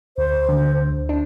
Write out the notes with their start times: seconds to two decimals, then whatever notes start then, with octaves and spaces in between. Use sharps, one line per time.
0.17 D2 C5
0.49 D3
0.78 D2
1.09 D4